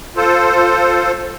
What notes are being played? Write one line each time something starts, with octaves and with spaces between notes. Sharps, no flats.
F4 A4 C5